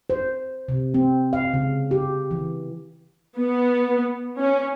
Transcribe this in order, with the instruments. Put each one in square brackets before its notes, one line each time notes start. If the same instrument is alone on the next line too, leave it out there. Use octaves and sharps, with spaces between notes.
[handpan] C5
C3
C4
F5
C#3
G4
E3
[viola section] B3
C#4